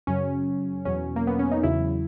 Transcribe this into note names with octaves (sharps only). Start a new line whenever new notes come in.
F#2 C#3 F#3 C#4
E2 B2 F#3 C#4
A#3
B3
C#4
D#4
E2 C#3 F#3 E4